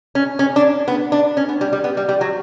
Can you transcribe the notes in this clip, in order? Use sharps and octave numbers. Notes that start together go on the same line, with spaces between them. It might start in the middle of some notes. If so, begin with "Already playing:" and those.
C#4
C#4
D4
B3
D4
C#4
B3
G3
G3
B3
G3
G3
F#3